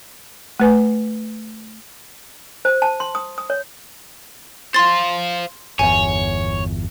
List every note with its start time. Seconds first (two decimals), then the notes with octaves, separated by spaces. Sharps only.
0.60 A3 B4 G#5
2.65 C5
2.82 A5
3.00 C6
3.15 D#6
3.38 D#6
3.50 C#5
4.74 C5 F5 C6 A6
5.79 G1 E2 C#5 G#5